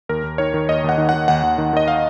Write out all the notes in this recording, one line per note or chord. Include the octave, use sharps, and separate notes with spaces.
D#2 A#4
D#2
D#3 C#5
D#3
D#2 D#5
D#2 F#5
D#3
D#3 F#5
D#2 F#5
D#2
D#3
D#3 D#5
F5